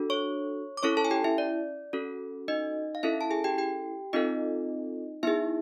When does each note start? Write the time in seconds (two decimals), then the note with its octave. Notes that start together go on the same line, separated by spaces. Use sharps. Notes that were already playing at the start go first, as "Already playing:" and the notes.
Already playing: D4 F#4 A4
0.10 C#5 C#6
0.77 D6
0.83 C#4 E4 A4 C#5 C#6
0.97 A4 A5
1.05 G#5
1.11 G4 G5
1.24 E4 E5
1.38 D5
1.93 C#4 F#4 A4
2.48 D#4 D#5
2.95 F5
3.03 C#4 E4 A4 E5
3.21 A5
3.31 G#4 G#5
3.44 G4 G5
3.58 G4 G5
4.13 C4 D#4 F4 A4 D#5
5.23 B3 D#4 E4 G#4 E5